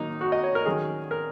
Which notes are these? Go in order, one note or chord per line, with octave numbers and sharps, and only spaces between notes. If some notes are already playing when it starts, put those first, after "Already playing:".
Already playing: D#3 F#3 A#3 D#4
F#4
D#5
C#5
A#4
D#3 F#3 C#4 G#4
A#4